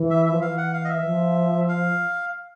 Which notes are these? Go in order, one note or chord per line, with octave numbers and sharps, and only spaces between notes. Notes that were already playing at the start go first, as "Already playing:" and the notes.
Already playing: E3
E5
E5
F3
E3 F5
F#5
F5
D#5
E5
F3
F5